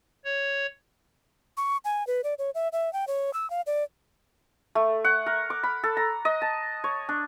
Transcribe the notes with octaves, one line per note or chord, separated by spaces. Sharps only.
C#5
C#6
G#5
B4
D5
C#5
E5
E5
G5
C#5
E6
F5
D5
A3
F#5
A#4
D6
B5
A4
A#5
D#5
A5
C#5
D4